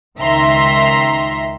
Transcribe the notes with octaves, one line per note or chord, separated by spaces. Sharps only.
C#2 D#3 E5 A#5 C6